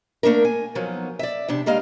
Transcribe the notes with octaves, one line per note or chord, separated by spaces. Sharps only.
A3 A#3 D4 A#4
G#5
F3 F#3 A#3 B3 D#4
D5 E5
E2 C3 D4
G3 G#3 A#3 D#5 F5